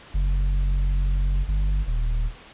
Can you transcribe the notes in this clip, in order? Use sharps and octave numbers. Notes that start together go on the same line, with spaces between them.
F#1
G1
D#1